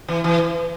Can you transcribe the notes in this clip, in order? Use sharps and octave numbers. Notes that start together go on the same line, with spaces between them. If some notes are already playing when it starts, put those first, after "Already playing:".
E3
E3